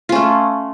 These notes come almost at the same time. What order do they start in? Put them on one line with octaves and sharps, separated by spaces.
F4 C#4 A3